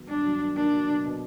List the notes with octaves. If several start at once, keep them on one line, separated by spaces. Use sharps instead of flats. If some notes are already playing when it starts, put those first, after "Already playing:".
Already playing: D#3 F#3 B3
G2 D4
F#3
D#3
A#3 D4
F#3
B2
B2